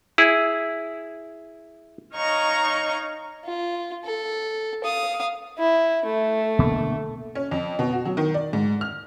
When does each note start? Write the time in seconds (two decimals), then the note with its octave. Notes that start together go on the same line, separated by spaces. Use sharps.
0.18 E4 G#4
2.15 D#4 C#5 D#5 F5 A#5 C#6
3.45 F4
4.04 A4
4.84 F5 D#6
5.58 E4
6.05 A3
6.59 B2 D3 A#3
7.35 C#4
7.51 F2
7.79 B2
7.93 F#4
8.06 F#3
8.17 D#3
8.34 D5
8.53 G#2
8.81 F6